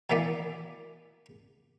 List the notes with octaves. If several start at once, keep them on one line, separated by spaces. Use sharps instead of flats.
B2 D#3 E3 A#3 B3 D5